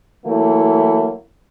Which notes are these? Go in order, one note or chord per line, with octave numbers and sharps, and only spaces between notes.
E3 F#3 A3 A#3 E4